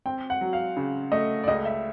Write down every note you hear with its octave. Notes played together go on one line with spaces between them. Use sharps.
C4 G5
F#5
F#3
F5
C#3
A3 D#5
D5
C#2 D#5
E5